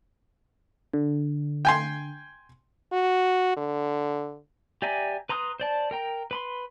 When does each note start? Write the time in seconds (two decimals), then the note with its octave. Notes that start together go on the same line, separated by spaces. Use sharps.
0.94 D3
1.65 G5 G#5 C6
2.92 F#4
3.57 D3
4.82 G4 D5 E5 G#5 A#5
5.29 B4 A#5 C6 D#6 F#6
5.60 C5 D5 A5
5.91 A#4 G5 A#5
6.31 B4 B5 C6